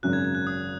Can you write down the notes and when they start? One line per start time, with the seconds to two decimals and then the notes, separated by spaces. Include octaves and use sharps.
0.03 G#1 F#2 C#3 F#3 F#6
0.13 G#6
0.25 G#6
0.35 F#6
0.47 D#6